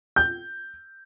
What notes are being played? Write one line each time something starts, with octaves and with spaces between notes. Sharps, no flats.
G6